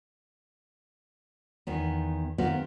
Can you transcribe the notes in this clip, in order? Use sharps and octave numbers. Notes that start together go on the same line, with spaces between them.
E2 D#3 B3
D#3 B3 C4 G4 F5